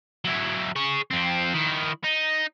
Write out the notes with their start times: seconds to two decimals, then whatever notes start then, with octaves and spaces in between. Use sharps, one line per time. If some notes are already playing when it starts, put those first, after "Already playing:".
0.25 F#3 E4
0.76 G#4 C#5
1.11 F2 C4
1.54 D#3 E4
2.04 D#4